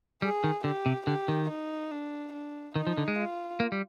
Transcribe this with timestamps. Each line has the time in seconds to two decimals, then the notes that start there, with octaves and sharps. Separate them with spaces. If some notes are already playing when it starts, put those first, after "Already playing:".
0.22 G3 G#4
0.44 D#3
0.64 D3 G4
0.86 C3
1.06 D3 G4
1.28 D#3
1.50 D#4
1.91 D4
2.33 D4
2.76 D#3 D#4
2.87 F3
2.97 D3
3.08 G#3
3.19 F4
3.60 A#3
3.72 G3